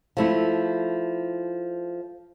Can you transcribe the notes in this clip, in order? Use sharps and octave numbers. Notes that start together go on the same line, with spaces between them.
F3 A3 E4